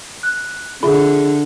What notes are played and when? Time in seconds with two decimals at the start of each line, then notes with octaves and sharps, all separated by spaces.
0.23 F#6
0.83 D3 F4 G#4 E5